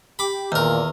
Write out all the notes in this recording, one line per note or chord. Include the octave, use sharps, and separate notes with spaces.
G4 B5 D6
E2 A#2 D#3 A#4